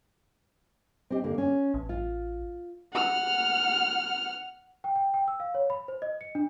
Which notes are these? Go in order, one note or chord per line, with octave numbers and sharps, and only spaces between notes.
C4 G4 D#5
D3 A#3
C#4
A1
F4
F#5 F6
G5
G5
G5
E6
F5
C#5
B5
C5
D#5
C#7
D4